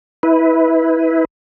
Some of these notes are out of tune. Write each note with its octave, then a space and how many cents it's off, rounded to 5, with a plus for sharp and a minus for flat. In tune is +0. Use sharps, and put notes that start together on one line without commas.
E4 -25 B4 +0